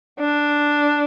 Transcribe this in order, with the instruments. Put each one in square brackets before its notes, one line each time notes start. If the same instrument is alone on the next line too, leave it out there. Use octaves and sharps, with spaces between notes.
[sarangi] D4